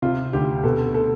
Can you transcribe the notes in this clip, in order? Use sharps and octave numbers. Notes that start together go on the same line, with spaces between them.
C3 F4
D2 G4
B2 A4
A4